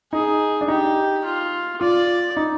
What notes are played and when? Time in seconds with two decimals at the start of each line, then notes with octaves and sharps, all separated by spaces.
0.12 D#4 G#4
0.61 D4
0.68 D#4 G4
1.25 F4
1.81 F4 D5
2.37 D#4